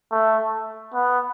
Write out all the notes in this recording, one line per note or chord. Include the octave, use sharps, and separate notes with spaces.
A3
B3